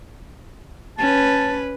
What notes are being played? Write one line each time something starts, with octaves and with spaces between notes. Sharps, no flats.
C#4 B4 A5